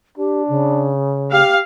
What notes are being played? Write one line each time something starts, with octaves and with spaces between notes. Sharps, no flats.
D4 G4
C#3
G4 F5